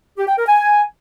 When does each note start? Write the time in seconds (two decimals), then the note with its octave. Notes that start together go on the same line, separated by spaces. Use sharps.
0.18 G4
0.28 G5
0.38 A#4
0.48 G#5